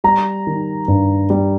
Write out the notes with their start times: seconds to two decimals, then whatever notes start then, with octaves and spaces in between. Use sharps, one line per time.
0.04 G3 A#5
0.47 D#3
0.88 G2
1.30 G3